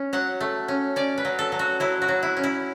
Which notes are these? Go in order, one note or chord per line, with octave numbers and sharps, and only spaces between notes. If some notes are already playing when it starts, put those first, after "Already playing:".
Already playing: C#4
F#3 F#5
A3
C#4
C#4 D5
B4
F#3
A4
F#3
F#4
F#3 E4
F#4
F#3
E4
C#4
E4